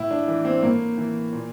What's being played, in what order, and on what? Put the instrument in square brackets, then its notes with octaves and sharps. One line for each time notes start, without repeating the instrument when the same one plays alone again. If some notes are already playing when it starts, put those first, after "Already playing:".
Already playing: [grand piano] A2 E4
D4
E3
C4
A2 A#3
E3
A#2